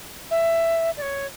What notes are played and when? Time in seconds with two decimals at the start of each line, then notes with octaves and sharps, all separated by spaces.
0.30 E5
0.97 D5
1.01 C#5